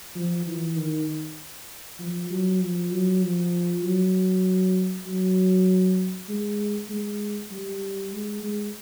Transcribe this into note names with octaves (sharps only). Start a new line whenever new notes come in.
F3
E3
D#3
F3
F#3
F3
F#3
F3
F#3
F#3
G#3
G#3
G3
G#3
G#3